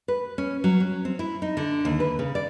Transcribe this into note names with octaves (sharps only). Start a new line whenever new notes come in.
B4
C#4
F#3
C#4
C4
E4
D#4
D3
D#2
B4
C#3
D5